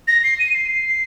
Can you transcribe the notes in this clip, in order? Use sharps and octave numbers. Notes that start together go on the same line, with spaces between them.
A#6
C7
D#7
C7